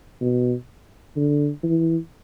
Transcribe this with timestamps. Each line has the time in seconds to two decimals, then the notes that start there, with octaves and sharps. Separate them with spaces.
0.21 B2
1.16 D3
1.63 E3